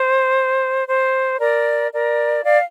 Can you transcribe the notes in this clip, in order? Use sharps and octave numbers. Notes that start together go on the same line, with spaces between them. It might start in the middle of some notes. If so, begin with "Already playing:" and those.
Already playing: C5
C5
A#4 D5
A#4 D5
D5 F5